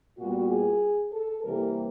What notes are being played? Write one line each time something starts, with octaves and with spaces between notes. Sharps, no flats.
A#2 G3 B3 F#4
G#4
A4
C3 E3 G3 A#3 A#4